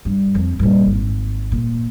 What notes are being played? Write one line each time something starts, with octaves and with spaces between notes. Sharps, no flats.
G2
F2
G2 A#2
G#1
A#2